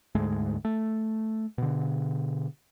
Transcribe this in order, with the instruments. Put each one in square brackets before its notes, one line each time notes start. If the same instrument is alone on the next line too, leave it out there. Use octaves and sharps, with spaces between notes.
[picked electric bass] D2 G#2 G#3 A3
A3
B2 D3